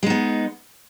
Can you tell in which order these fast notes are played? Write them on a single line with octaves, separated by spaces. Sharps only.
G#3 D#4 B3